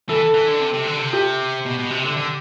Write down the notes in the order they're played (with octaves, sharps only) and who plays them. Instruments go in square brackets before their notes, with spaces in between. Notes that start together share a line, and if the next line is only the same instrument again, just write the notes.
[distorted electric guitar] E3 [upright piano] A4
[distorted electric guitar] E3
D3
C3
C3
D3
C3
[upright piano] G4
[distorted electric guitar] B2
B2
C3
D3
D3